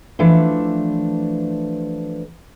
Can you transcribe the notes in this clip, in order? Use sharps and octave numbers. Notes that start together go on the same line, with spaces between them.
E3 F3 A3 D4